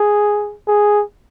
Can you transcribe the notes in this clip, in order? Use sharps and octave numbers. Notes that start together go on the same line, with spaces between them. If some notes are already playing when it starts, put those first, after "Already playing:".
Already playing: G#4
G#4